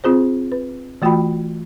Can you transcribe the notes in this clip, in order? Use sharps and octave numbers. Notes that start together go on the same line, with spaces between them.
C4 F4 G#4 C5
B4
E3 A3 F4 F#4 G5 B5